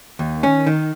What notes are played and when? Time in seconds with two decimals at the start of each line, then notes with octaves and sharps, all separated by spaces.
0.19 D#2 D#3
0.43 C#4
0.66 D#3